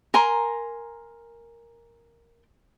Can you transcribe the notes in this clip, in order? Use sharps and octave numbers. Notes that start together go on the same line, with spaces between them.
A#4 G#5 A#5 C6